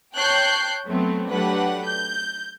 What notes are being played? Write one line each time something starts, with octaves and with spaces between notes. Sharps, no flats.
C#5 G5 A5 F#6 G6 C7
F#3 A3 B3 C4
F#3 A3 D4 G4 B4 F#5
G6